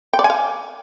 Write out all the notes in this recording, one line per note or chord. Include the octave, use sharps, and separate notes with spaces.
G5
D5
G#5
F5